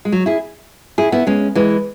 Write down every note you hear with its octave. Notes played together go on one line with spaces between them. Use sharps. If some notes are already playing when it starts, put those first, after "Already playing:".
G#3
F#3
E4 G#4
E4 G#4
B3 E4
G#3 C#4
E3 G#3